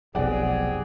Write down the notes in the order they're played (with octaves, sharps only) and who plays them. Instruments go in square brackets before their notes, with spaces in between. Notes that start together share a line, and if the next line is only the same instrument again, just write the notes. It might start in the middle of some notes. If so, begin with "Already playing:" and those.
[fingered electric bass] F1 B1 [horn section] C4 G4 G#4 [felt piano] D5 F#5